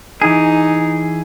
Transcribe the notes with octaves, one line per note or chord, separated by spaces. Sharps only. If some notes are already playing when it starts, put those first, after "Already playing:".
E3 D#4 G#4